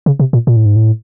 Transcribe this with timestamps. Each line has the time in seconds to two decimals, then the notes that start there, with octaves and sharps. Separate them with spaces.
0.06 C#3
0.20 C3
0.33 A#2
0.47 A#2
0.56 A2
0.66 G#2
0.76 A2